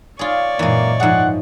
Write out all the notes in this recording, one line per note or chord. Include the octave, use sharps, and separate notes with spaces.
F4 G#4 C#5 D5
F#2 A#2 E3 G#3 A#3
G#2 F3 G#4 F#5